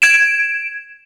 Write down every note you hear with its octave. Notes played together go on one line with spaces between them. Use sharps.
G#6 D7 E7